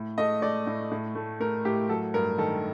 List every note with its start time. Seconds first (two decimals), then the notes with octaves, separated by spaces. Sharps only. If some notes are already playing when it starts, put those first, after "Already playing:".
Already playing: A2
0.18 A3 D#5
0.42 A3 D5
0.67 A2
0.91 A2
1.15 A3
1.40 A3 A#4
1.65 A2 G4
1.89 F#3 A4
2.14 G2 A#4
2.38 D#3 A4